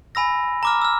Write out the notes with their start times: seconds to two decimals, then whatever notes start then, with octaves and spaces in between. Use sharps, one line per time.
0.15 G#5 B5 E6 A#6
0.63 A#5 D6 F6
0.82 E6 F6